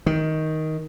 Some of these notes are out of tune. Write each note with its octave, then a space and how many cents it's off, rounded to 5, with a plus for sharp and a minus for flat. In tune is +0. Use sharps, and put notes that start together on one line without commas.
D#3 +10